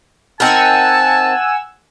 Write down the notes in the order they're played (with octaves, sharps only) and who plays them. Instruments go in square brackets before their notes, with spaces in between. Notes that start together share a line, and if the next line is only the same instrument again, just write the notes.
[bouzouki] C4 D#4 A#4 [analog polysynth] F#5 G#5 E6 [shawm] A5